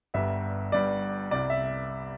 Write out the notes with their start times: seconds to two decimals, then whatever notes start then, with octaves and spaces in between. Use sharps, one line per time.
0.14 G1 G2 G3 E5
0.72 G1 G2 G3 D5
1.31 C2 C3 G3 D5
1.50 E5